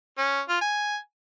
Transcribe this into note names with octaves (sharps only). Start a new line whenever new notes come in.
C#4
F4
G#5